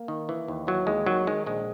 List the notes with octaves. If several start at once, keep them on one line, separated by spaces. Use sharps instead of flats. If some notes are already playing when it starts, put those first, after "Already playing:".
Already playing: A#3
D#3
E3
D#2
E3 F#3
D#2 G#3
D#3 F#3
D#3 G#3
A#1 G#3